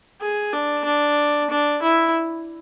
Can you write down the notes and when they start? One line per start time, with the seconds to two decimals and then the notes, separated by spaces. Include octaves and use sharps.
0.22 G#4
0.53 D4
0.85 D4
1.50 D4
1.82 E4